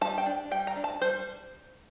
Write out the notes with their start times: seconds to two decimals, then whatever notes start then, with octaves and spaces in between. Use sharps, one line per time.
0.01 G3 A5
0.18 G5
0.26 D4
0.51 G3 G5
0.67 A#5
0.76 D4
0.84 A5
1.01 G3 C5